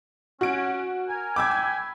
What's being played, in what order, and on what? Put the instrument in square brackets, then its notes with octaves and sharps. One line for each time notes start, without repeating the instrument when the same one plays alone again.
[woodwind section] C#4 [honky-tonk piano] F#4 D7
[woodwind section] A#4 G#5
[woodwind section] G5 G#5 B5 [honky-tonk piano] D6 E6 G#6
[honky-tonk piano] G#6